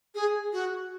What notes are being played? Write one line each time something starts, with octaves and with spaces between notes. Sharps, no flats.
G#4
F#4